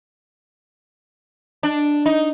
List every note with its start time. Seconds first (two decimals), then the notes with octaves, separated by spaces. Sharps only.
1.63 D4
2.06 D#4